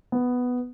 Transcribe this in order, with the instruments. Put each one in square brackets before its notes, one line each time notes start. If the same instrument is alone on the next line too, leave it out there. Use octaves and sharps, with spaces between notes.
[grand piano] B3